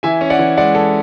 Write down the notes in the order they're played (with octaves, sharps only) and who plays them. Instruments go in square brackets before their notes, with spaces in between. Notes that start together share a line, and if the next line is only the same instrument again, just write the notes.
[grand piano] E3 E5 G#5
C#4
D5 F#5
E3
G#3 D5 F#5
G#3 A4